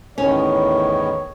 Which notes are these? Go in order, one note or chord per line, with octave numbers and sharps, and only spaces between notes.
E2 A2 D#3 C#4 C#5